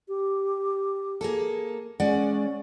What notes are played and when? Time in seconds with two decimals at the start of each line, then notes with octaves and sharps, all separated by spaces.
0.08 G4
1.21 A#3 G#4 A4
2.00 G#3 C#4 D5 F#5